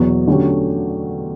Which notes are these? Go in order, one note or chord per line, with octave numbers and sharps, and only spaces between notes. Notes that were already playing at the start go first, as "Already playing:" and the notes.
Already playing: E2 B2 F#3 B3
D3 F#3 A3 C#4 G4